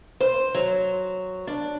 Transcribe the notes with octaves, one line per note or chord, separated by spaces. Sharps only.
C5
F#3
D4